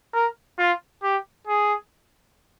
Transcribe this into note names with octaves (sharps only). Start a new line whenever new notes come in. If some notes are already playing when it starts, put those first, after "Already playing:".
A#4
F4
G4
G#4